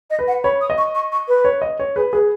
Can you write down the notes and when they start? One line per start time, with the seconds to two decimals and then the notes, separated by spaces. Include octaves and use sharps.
0.10 D#5
0.19 B4
0.28 F#5
0.44 C#5 B5
0.61 D#6
0.70 D#5
0.78 C#6
0.95 C#6
1.12 C#6
1.28 B4
1.45 C#5
1.62 D#5
1.79 C#5
1.96 G#4 B4
2.12 G#4 B4